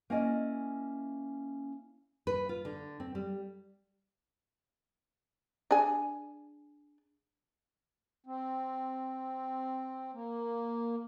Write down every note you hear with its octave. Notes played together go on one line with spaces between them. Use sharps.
A#3 C#4 E4 D5 D#5 G#5
B4
F4
D3
C4
G3
D4 G#4 G#5
C4
A#3